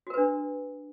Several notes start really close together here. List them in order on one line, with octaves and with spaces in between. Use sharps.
F#4 A#4 B4 D4